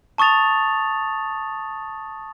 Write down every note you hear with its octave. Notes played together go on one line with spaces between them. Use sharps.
A5 C#6 D#6 A6 F7